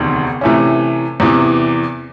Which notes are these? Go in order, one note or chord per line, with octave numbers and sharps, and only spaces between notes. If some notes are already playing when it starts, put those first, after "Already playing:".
Already playing: E1 D2 C3 D#3
C3 E3 A3 C#4
E2 C3 E3